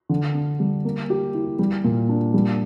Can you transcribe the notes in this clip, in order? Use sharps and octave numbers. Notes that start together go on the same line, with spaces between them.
D3
D4
G3
A#3
G4
E4
G3
A#2
D4
G3